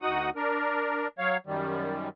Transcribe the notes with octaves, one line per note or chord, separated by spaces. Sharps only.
D2 D#4 F#4 F#5 D#6
D4 A#4
F#3 C#5 F5
F#2 D#3 G3